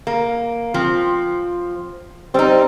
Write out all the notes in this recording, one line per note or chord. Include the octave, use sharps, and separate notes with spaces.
A#3
F3 C4
G3 C4 D#4